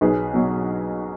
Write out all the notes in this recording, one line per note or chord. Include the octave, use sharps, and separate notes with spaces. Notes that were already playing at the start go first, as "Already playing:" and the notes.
B1 G#4 B4
B2 F#3